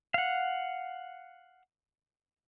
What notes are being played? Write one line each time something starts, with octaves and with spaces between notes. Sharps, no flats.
F5 F#5